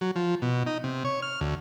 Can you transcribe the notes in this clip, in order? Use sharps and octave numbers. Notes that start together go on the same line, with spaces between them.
F#3
F3
B2
D#4
C3
C#5
F6
D2